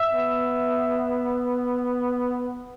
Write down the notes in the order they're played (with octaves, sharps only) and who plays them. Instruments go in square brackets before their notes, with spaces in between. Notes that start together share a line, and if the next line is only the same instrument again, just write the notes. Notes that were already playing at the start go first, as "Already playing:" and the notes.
Already playing: [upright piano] E5 E6
[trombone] B3